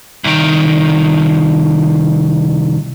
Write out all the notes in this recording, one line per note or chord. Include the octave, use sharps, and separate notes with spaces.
C2 D#3